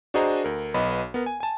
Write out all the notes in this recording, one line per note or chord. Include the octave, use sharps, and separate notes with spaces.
D4 F#4 G#4 C5 D#5 A#5
D2 A#4
B1 B3 D#5 B5
B3 A#4
G#5
G#5 A5